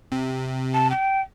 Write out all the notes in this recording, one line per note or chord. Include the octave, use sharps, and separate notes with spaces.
C3
A5
G5